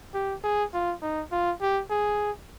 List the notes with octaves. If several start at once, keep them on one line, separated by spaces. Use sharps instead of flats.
G4
G#4
F4
D#4
F4
G4
G#4